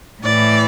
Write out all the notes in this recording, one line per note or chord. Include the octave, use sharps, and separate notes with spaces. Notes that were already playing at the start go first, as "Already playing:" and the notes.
A2 E3 D5